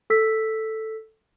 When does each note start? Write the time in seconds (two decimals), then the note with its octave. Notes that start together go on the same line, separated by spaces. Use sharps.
0.10 A4 E6 B6